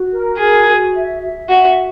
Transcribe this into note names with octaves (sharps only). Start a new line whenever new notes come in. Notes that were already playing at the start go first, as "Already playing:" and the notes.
Already playing: F#4
A#4
F#4 G#4
F#4
E5
E5
F#4 E5